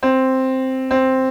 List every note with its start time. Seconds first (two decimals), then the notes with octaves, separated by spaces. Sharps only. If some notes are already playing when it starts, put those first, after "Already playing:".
0.03 C4
0.91 C4